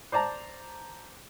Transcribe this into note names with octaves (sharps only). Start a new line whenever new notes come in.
C5 D5 A5 A#5